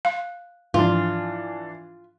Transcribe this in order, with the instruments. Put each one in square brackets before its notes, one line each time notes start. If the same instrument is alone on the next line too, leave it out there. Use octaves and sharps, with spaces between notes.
[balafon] F5 [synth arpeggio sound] F#6
[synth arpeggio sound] G#2 F3 [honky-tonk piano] E3 D4 [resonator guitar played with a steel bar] F4